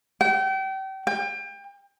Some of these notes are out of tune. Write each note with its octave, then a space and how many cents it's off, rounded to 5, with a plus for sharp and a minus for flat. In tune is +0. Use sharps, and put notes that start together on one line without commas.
G5 -35
G5 +30